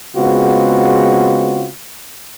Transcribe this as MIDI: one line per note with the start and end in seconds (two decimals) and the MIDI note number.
0.16 1.68 49
0.16 1.68 56
0.16 1.68 59
0.16 1.68 60
0.16 1.68 65
0.16 1.68 66